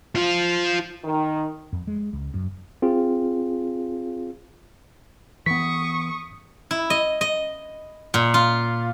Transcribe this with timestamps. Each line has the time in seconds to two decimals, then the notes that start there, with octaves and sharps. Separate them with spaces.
0.15 F3 F4
1.03 D#3
1.72 F2
1.87 G#3
2.13 C#2
2.34 F#2
2.82 C4 F4 G#4
5.46 E3 B3 C#6 D#6 B6
6.71 E4
6.90 D#5
7.21 D#5
8.14 A#2
8.34 F4